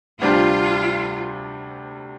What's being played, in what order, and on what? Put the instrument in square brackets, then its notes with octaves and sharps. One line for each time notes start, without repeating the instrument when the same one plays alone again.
[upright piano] D2 C3 G3 D4 G4 [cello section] F4